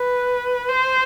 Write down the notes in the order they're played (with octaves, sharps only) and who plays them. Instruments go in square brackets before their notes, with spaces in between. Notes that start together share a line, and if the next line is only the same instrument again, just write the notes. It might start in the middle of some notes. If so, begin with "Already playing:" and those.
Already playing: [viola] B4
C5